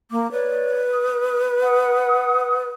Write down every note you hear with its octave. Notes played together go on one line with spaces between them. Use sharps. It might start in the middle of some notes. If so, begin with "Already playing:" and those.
A#3 D6
B4 C#5 D5
D#6
F#5 D#6